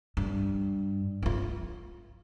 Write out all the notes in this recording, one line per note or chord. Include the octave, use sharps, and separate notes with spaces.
G2
E4 F4